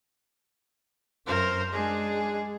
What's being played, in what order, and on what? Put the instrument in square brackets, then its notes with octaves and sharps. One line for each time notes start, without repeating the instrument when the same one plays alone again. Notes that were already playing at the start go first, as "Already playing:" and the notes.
[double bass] F#2 [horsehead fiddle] A#4 C5
[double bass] G#3 [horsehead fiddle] D4 G#4